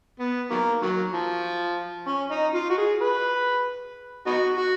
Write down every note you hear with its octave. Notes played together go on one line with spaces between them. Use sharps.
B3
D#3 F#3 A#3
D#3 F#3
F3
C#4
D#4
F4
F#4
G#4
B4
B3 D#4 F#4
F#4